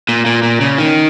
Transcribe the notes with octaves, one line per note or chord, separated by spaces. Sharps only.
A#2
A#2
A#2
C#3
D#3